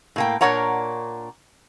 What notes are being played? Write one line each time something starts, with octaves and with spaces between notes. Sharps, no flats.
A2 A#3 G5
A#2 D4 A#4 C#5 F#5 A#5